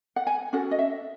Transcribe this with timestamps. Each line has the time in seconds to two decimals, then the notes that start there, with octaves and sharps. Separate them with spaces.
0.16 F#5
0.27 G#5
0.53 C#4 F#4 A4 F#5
0.71 D#5
0.79 E5